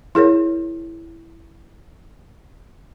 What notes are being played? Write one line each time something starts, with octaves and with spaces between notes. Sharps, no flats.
E4 G#4 A#4 C#5